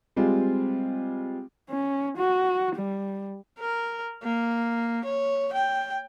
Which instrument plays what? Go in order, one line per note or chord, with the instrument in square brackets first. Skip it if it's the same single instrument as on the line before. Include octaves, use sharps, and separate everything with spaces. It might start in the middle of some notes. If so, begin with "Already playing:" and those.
[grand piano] G3 G#3 C4 F4
[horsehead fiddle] C#4
F#4
G3
[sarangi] A#4
A#3
C#5
G5